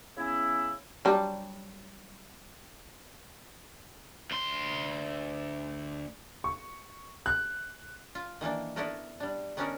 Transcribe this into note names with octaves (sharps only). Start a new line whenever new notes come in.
C#3 B3 C#4 E4
F#3 G3 D4
D2 C6
C#6
F#6
F4
D#3 E3 A#3 D4
B3 D4 E4 F#4 A4 A#4
G3 D4
D#3 B3 C#4 D4 F#4 A#4